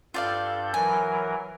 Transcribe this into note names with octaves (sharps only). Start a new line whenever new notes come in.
G2 F4 A4 D5 F5 G6
E3 F#3 A#4 G#5